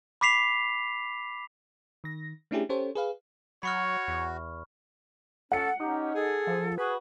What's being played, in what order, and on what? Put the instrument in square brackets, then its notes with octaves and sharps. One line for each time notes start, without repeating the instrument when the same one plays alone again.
[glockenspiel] B5 D6 B6 C7 F7
[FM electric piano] D#3 A#6
A3 C#4 D4 E4 G4 G#4
C#4 G4 A4 C5 C#5
G#4 B4 F5
[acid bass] F#3 [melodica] F#4 [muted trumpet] C#5 [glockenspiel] B5 C#6 F6
[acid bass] E2
[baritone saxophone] C#4 [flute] A4 [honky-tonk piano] F#5 C#7
[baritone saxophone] C#4 [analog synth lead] D#4 [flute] G4
[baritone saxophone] G#4 [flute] A4
[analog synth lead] F3
[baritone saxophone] F#4 [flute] G#4 [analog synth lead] B4